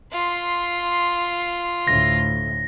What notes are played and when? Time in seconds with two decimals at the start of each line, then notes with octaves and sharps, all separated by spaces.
0.12 F4 C6
1.87 D2 A2 A#6